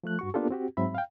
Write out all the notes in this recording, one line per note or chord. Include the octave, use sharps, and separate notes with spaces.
F3 A3 F#6
G2 F#4 C#6
A#3 B3 D4 F4 G4 A4
C4 F#4 G4
G#2 F#3 C4 E5 B5
F5 G5